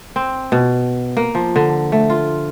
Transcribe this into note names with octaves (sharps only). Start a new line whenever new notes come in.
C4
B2
A#3
F3
D3
A3
F4